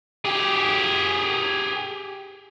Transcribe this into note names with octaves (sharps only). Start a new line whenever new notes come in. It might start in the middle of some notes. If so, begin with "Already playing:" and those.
G4 G#4